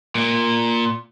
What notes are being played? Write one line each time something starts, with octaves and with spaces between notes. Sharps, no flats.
A#2